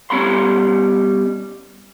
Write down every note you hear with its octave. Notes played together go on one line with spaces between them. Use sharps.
B2 G3 C#4 B5 C6